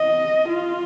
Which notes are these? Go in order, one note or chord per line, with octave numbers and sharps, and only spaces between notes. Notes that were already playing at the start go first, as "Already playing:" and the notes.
Already playing: D#5
F4